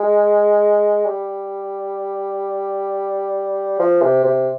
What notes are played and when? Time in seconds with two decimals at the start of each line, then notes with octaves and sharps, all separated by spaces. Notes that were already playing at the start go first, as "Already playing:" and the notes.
Already playing: G#3
1.05 G3
3.80 F3
4.02 C3
4.24 C3